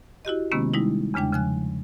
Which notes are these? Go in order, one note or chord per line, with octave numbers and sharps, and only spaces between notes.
E4 F#4 G4 D#5
C3 D#3 G#3 A#3 B3 C#4
G3 G#3 D#4 E4
E2 C#3 G#3 D4 G5
C#3 F3 G#5 F#6